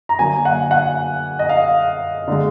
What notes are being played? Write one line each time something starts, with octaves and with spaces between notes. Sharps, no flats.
A#5
D3 F#3 A#3 G#5
F#5
F#5
D#5
F5
D3 G#3